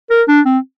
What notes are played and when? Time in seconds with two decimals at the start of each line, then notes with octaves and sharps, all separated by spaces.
0.10 A#4
0.28 D4
0.46 C4